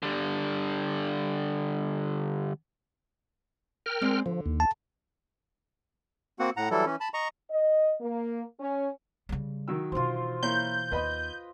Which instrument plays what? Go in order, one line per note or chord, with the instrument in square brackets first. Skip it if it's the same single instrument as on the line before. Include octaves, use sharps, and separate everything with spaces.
[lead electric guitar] D3 G3
[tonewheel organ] A#4 G5 F6
[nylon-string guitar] G#3 C4 D5
[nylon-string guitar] D3 [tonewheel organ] F3
[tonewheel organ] D#2
[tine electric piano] A5
[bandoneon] A#3 C4 F#4 F#5
A2 F#5 A#5
E3 F#3 G3 E4 A4
E3 C#4
A5 B5
D#5 A#5 C#6
[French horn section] D#5
A#3
C#4
[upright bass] C#3 G3
[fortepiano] D#3 F#3 E6
[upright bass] B2 E3 [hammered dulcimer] F4 C5
[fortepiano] A#3 E4 C#5 [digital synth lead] G6
[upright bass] D#2 [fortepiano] B4 D#5 B5